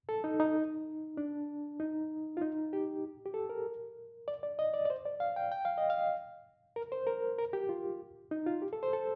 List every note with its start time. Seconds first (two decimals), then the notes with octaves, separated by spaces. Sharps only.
0.09 A4
0.24 D#4
0.40 D#4
1.17 D4
1.80 D#4
2.37 F4
2.42 D#4
2.73 G4
3.26 G4
3.34 A4
3.49 A#4
4.28 D5
4.43 D5
4.59 D#5
4.74 D5
4.85 D5
4.90 C5
5.05 D5
5.20 F5
5.36 G5
5.52 G5
5.65 F5
5.78 D#5
5.90 F5
6.76 A#4
6.92 C5
7.07 A#4
7.39 A#4
7.53 G4
7.69 F4
8.31 D#4
8.46 F4
8.62 G4
8.73 A4
8.83 C5
8.93 A4